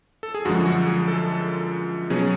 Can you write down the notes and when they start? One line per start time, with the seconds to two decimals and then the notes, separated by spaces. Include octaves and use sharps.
0.23 A4
0.34 G#4
0.45 F#2 D3 F3 G#3 F#4
0.66 F#4
0.86 G#4
1.08 A4
2.10 B2 F#3 C#4 G#4